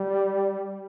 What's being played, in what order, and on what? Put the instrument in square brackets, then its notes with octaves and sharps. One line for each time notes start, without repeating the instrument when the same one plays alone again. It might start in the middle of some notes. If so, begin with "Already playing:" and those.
Already playing: [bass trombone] G3